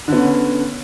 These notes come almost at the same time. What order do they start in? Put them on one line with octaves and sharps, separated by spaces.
D3 B3 C#4